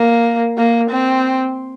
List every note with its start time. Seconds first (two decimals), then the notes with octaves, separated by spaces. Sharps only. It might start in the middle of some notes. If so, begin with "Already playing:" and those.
Already playing: A#3
0.58 A#3
0.91 C4